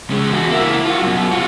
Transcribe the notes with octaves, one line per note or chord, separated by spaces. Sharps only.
C#3 G#3
E2 F#4
A#3 E4
F4 F#4
F#2 B2
F4 F#4